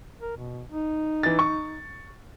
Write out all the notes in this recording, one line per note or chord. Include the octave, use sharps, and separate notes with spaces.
A#4
B2
D#4
E3 A6
C#6